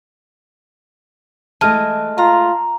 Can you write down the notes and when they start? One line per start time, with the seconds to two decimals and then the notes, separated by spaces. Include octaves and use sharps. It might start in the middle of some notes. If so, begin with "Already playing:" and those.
1.61 E3 G#3 A3 D#5 A5 F6
2.18 F4 A#5